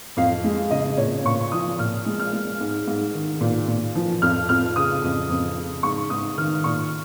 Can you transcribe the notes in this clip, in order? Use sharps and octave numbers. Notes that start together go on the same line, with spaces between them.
F2 F5
G#3
C#3 D#5
A#2 C#5
A#2 C#6
F3 D#6
A#2 F6
G#3
F6
G#3
G#2
G#2
D#3
A#2
A#2
F3
F2 F6
F2 F6
C#3 D#6
F2
F2
C#3
G#2 C#6
G#2 D#6
D#3 F6
A#2 C#6